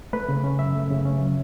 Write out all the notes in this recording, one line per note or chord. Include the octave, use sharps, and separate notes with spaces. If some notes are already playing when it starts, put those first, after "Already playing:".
A3 B4
C#3
C#4
F#2 E5
A3
C#3
C#4
F#3